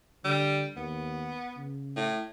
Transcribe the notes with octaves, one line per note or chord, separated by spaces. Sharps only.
D3 G3
D#2 B3
C#3
A2